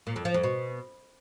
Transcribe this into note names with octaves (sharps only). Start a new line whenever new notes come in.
A#2
F2
F3
F2
B2